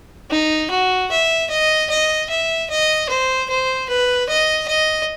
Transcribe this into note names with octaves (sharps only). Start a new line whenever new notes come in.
D#4
F#4
E5
D#5
D#5
E5
D#5
C5
C5
B4
D#5
D#5